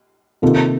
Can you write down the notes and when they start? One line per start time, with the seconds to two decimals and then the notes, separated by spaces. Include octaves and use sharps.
0.42 C3 D#3 A#3 F4 A4